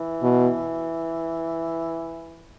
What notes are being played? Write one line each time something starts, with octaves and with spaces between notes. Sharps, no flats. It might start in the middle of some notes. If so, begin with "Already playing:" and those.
Already playing: E3
B2